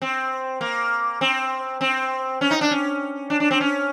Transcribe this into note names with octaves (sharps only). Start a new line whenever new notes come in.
C4
A#3
C4
C4
C#4
D#4
D4
C#4
D4
D4
C4
C#4